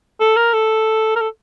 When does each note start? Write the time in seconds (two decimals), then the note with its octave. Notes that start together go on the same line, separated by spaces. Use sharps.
0.20 A4
0.37 A#4
0.54 A4
1.16 A#4
1.21 A4